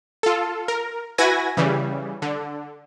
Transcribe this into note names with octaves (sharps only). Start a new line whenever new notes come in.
F4 A4
A#4
E4 F#4 B4 G#5 G#6 A#6
C#3 E3 G3
D3